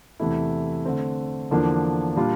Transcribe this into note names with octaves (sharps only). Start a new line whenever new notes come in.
E2 C3 E3 A3 E4
D3 A3 C4
E2 D3 F3 A#3 D4
A#2 G3 D4 F4